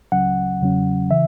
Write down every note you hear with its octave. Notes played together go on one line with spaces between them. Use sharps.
C#2 C#3 F#3 C#4 F#5
E2 C#3 F#3 C#4
C#3 E3 E5